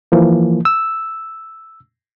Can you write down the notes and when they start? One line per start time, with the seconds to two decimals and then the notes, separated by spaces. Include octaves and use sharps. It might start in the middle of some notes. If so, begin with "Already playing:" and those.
0.12 E3 F3 A#3
0.65 E6